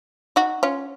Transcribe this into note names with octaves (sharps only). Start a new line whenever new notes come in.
D#4 F#4
C#4 F4